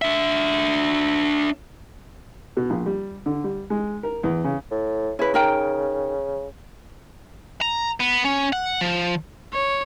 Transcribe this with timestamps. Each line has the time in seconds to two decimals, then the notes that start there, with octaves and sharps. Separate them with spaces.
0.02 D4 E5
2.57 B2
2.70 A#1
2.86 G3
3.26 D3
3.44 G3
3.70 G#3
4.03 A#4
4.23 E2
4.44 C#3
4.71 A2
5.19 C#3 E4 B4
5.34 D#4 A#4 G5
7.62 A#5
8.01 B3
8.25 C#4
8.53 F#5
8.81 F3
9.53 C#5